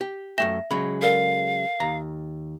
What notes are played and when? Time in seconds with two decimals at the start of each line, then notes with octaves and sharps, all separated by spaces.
0.01 G4
0.38 F#2 A3 E5 G5 A#6 E7
0.71 C#3 F#3 G#3 B5
1.02 A4 A#4 D5 F5
1.80 D#2 A#5